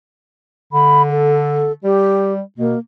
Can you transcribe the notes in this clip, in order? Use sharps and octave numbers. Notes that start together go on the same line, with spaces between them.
D3 B5
A4
G3 G4
B2 A#3